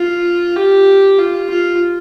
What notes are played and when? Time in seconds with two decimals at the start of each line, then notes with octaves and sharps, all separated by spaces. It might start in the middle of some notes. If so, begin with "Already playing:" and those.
Already playing: F4
0.56 G4
1.18 F4
1.50 F4